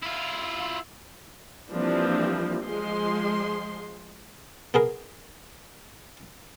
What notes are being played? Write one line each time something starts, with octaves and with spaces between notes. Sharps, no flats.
E4 F4
E3 F3 G3 A#3 C4 D4
F3 G#3 C6
B3 G#4 A#4